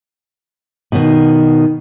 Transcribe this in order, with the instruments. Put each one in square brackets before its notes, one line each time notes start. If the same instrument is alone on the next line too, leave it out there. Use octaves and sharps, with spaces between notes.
[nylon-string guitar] B2 D#3